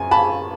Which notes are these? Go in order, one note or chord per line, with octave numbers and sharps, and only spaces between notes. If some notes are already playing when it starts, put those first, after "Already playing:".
Already playing: F#2 G#5
A5 B5